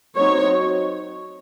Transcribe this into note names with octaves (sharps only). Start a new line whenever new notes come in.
F#3 C4 D#4 C#5